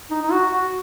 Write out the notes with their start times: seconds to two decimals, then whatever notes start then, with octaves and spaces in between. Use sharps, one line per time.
0.11 D#4
0.22 D#4
0.32 F#4
0.52 F#4